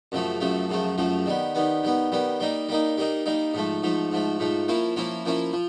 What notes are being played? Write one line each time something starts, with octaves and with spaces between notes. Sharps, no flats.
F#2 C#3 F3 A3
F#2 C#3 F3 A3
F#2 C#3 F3 A3
F#2 C#3 F3 A3
D#3 G3 B3
D#3 G3 B3
D#3 G3 B3
D#3 G3 B3
G3 A#3 D#4
G3 A#3 D#4
G3 A#3 D#4
G3 A#3 D#4
G#2 F3 A3
G#2 F3 A3
G#2 F3 A3
G#2 F3 A3
F3 A#3 C#4 E4
F3 A#3 C#4 E4
F3 A#3 C#4 E4
F3